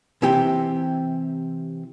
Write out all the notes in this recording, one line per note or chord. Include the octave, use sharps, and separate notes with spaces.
C3 E3 E4 G4 G5